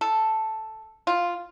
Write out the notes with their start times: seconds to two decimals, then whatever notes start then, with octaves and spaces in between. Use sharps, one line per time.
0.01 A4
1.07 F4